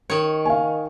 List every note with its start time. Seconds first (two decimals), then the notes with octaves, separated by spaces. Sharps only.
0.10 D#3 C#5
0.45 F5 G#5